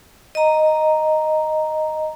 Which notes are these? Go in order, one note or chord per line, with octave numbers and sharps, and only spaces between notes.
D#5 A#5